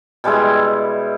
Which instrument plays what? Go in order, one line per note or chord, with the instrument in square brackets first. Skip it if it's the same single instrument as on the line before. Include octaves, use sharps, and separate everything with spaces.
[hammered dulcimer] B2 G3 G#3 E4